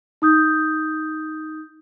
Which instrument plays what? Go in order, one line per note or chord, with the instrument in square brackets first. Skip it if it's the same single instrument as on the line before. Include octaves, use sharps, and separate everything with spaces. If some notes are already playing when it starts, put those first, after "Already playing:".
[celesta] D#4 D#6 G6